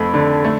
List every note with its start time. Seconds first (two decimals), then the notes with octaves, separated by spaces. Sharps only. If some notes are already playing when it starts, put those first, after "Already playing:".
Already playing: F2 A3 B5
0.14 D3
0.44 A3